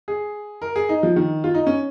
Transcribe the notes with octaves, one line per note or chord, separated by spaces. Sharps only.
G#4
A#4
G#4
D#4
F3
D#3
F4
D#4
C#4